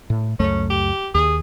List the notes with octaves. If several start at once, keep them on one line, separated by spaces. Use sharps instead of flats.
A2
C#2 F#2 A3 C#4
G4
D#2 G#4